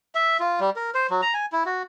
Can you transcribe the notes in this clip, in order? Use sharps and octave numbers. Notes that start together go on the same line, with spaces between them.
E5
F4
G3
A#4
C5
F#3
A#5
G#5
E4
F#4